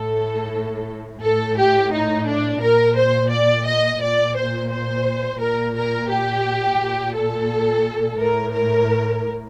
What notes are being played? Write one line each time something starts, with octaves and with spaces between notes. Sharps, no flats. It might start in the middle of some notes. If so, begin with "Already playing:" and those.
Already playing: A2 A4
A2 A4
G4
D#4
D4
A#2 A#4
C5
D5
D#5
A#2 D5
C5
C5
A#2 A#4
A#4
G4
A#2
A4
A2 A#4
A#4